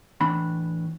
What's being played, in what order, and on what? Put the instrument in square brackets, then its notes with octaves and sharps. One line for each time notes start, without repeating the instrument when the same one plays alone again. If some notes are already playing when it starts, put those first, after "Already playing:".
[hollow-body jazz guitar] A2 E3 D4 B5